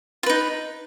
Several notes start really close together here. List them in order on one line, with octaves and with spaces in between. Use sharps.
F4 B4 D#4